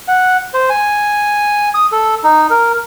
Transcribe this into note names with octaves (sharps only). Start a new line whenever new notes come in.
F#5
C5
G#5
D#6
A4
D#4
A#4